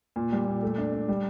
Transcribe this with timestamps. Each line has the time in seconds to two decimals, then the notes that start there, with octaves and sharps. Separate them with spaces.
0.16 A#2
0.32 G3
0.47 A#2
0.63 A3
0.78 D4
0.93 D4
1.09 G3